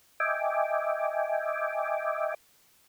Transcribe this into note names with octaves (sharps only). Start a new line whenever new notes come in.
D#5 E5 G5 G#5 D6